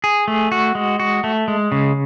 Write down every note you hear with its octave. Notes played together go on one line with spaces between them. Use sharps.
G#4
A3
F#4
G#3
F#4
A3
G#3
C#3